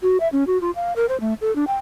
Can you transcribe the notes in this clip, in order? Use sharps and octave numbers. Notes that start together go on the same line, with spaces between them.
F#4
E5
C#4
F#4
F4
F5
A#4
C5
A3
A4
D4
G5